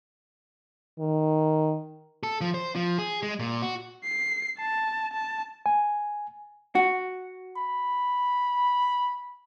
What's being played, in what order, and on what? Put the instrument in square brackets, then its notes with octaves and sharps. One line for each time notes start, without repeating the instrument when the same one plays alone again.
[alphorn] D#3
[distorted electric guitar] A4
F3
C5
F3
G#4
G#3
A#2
F#4
[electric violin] C7
A5
A5
[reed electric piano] G#5
[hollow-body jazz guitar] F#4
[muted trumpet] B5